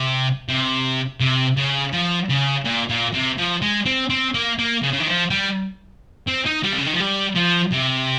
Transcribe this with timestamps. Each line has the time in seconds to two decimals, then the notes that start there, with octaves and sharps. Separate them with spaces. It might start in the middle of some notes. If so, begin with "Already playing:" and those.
Already playing: C3
0.48 C3
1.20 C3
1.57 C#3
1.93 F3
2.30 C#3
2.65 A#2
2.90 A#2
3.14 C3
3.38 F3
3.62 G#3
3.86 C4
4.10 C4
4.34 A#3
4.59 A#3
4.83 C#3
4.93 C#3
5.00 D#3
5.07 F3
5.30 G3
6.27 C4
6.45 D#4
6.63 G3
6.72 C3
6.78 C#3
6.86 D#3
6.93 F3
7.00 G3
7.36 F3
7.73 C3